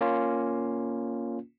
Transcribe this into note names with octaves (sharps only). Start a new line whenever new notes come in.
A#3 C#4 F4